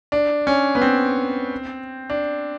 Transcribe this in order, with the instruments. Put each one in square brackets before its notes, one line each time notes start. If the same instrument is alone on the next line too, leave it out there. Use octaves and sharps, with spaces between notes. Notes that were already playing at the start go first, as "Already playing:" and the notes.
[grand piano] D4
C#4
B3
C4
D4